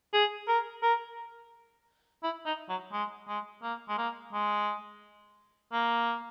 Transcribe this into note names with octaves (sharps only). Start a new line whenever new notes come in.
G#4
A#4
A#4
E4
D#4
F#3
G#3
G#3
A#3
G#3
A#3
G#3
A#3